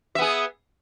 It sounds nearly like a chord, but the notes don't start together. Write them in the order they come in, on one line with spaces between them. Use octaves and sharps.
E5 B3 G#4